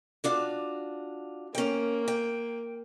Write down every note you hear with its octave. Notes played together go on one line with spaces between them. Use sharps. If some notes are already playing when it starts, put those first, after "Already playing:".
D4 F4 F#4
A#3 C#4 G5
G5